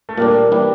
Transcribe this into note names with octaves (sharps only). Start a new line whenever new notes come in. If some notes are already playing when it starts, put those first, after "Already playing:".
A3
A#2 G3 A#3 D4
E3 G3 D4